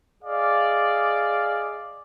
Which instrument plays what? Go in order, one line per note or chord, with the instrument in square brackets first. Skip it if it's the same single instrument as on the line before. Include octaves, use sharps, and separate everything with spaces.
[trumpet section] G#4 D5 D#5 F5